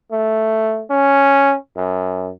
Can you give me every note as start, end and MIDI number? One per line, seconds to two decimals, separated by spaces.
0.12 0.83 57
0.91 1.55 61
1.77 2.31 42